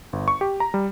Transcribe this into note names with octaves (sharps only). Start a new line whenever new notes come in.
G1
C#6
G4
A#5
G3